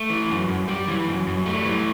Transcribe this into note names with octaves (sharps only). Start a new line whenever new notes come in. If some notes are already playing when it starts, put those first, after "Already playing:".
Already playing: A3
E3
F#2
F#2
G3
E3
F#2
F#2
G3 A3
E3